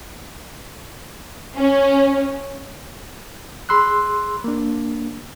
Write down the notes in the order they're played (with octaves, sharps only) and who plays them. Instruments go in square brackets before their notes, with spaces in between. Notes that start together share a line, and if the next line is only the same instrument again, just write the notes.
[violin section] C#4
[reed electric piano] G#4 B5 C6 E6 F#6
A#3 D4